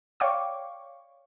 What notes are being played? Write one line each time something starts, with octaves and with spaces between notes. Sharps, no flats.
C#5 D5 F5 G5 C#6 D6